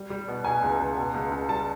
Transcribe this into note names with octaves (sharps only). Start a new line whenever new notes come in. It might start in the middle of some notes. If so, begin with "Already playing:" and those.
Already playing: G3
G3
B2
B2 G#5
C#2
C#2
B2
C#2
C#2
G3 A5